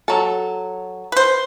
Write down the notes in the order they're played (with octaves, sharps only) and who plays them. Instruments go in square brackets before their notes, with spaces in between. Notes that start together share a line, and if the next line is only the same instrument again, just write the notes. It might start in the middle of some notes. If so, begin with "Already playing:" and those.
[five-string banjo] F#3 A4
[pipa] B4 C5